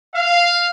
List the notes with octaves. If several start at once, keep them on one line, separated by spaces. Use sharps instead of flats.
F5